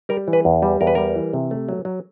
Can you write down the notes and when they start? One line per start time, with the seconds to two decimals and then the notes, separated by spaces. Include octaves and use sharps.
0.09 G3 A#4
0.28 E3
0.33 B4
0.45 E2
0.62 G3
0.81 E2 A#4
0.87 B4
0.95 G3 A#4
1.16 E3
1.33 C3
1.51 A3
1.69 F#3
1.85 F#3